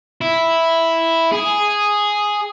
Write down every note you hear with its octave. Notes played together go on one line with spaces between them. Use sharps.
E4
G#4